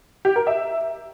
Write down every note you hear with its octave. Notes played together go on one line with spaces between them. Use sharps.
G4
A#4
E5